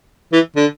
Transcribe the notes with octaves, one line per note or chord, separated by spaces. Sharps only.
E3
D3